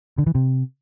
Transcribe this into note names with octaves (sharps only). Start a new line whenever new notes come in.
D3
E3
C3